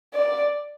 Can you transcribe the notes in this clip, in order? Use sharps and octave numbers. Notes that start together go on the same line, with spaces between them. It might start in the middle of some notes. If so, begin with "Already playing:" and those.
D5